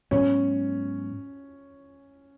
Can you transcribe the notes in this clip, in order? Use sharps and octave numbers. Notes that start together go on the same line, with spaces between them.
G#2 F#3 B3 C#4